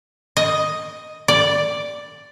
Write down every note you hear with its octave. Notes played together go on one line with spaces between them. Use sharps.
D#5
D5